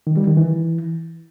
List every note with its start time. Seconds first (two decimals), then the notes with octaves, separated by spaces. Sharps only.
0.07 D#3
0.17 G3
0.27 D#3
0.37 E3